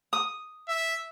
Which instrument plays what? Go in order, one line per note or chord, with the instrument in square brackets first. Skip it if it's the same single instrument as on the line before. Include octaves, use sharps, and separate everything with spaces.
[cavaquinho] D#6
[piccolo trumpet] E5